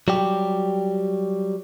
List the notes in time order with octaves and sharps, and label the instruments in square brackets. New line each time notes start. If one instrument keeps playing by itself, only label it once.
[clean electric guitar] F#3 G3 G4